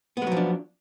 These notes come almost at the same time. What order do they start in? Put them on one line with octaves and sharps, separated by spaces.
B3 G#3 F#3 F3 D4